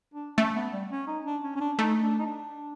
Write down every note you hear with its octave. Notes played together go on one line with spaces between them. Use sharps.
D4
A3 C#4
B3
G3
C#4
D#4
D4
C#4
C#4
D4
A3 D#4
D4
D#4
D4